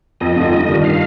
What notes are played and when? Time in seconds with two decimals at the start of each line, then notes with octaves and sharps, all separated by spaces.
0.21 F2 D#5
0.36 D3 F3 A3 D#4
0.52 G2
0.69 D#3 G3 D4 F4
0.84 F5